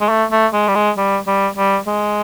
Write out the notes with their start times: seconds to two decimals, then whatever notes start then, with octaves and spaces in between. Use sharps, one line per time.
0.01 G#3
0.09 A3
0.32 A3
0.53 G#3
0.68 G3
0.75 G#3
0.98 G3
1.27 G3
1.57 G3
1.87 G#3